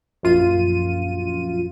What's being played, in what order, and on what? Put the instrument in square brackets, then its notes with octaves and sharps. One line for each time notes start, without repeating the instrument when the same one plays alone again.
[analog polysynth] A#1 F#2 F4 D#7